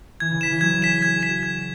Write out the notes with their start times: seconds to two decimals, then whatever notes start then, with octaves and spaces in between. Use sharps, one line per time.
0.20 E3 G#6
0.31 C#3
0.41 C#3 B6 E7
0.51 E3
0.61 F#3 G#6
0.82 G#4 B6 E7
1.02 G#4 G#6
1.16 G#4
1.23 B6 E7
1.30 F#4
1.43 G#6